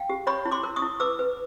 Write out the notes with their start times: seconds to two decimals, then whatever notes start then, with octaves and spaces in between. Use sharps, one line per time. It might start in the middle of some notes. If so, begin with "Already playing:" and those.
Already playing: F5 G5
0.09 G4
0.27 C#5 B5 C#6
0.45 E4
0.51 C6 D6
0.63 A#4
0.76 C#6 D#6
0.82 E4
1.00 B4 D6 E6
1.19 B4